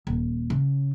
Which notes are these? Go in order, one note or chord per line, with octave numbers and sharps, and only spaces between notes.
D#1
C#3